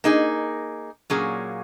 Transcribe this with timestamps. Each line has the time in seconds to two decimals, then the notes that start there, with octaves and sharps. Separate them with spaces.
0.04 A#3 D#4 G#4
1.10 A#2 F#3 A#3 C#4 G#4